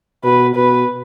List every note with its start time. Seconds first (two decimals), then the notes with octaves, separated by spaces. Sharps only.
0.24 B2 B4
0.55 B2 B4